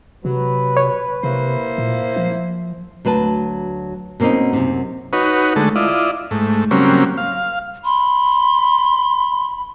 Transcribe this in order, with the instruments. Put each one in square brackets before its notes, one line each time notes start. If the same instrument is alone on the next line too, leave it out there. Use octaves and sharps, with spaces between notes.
[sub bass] C3 [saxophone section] F#3 [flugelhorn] B4
[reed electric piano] C#5
[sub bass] C3 [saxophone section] A#3 E4 C5
[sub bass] A#2
F3
[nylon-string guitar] D2 F#3 B4 A5
B2 A#3 C4 C#4 D#4
F#2 C3
[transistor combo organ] D#4 F#4 B4 C#5
D3 G#3 A3 A4
E4 F4 D5 D#5
G#2 A3
C#3 F#3 G3 A#3 C4 C#4
F5
[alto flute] B5 [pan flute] C6